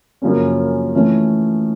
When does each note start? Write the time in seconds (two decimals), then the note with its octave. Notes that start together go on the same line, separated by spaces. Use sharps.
0.22 F#2 C#3 F3 A#3 C#4
0.94 E3 A3 C#4 F4